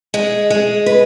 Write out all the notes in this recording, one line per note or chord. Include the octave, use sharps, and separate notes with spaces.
G#3
G#3
B4